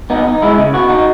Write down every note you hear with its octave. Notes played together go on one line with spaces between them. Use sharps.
B3 D#4
D#4
G#3 E4
C#3
B3 F#4
D#4